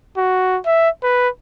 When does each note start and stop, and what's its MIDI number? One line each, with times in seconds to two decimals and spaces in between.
0.17 0.59 66
0.65 0.89 76
1.03 1.29 71